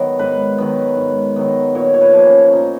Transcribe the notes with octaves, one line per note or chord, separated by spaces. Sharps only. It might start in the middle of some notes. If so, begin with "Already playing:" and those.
Already playing: D#3 F#3 B3
G#2 B4
D#3 F#3 B3
G#2
D#3 F#3 B3
A#2 C#5
C#5
B4
F3 A#3
C#4
C#4
A#2 D#4